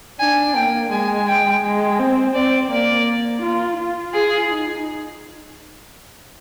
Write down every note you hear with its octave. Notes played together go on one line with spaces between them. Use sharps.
D4 G#5
A#3 G5
G#3 G#5
G5
G#3
C4
C4 D5
A#3 D5
F4
F4
G#4
D#4